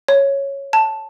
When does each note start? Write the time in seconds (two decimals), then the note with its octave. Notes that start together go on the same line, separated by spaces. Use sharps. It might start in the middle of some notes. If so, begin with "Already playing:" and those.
0.08 C#5
0.73 A5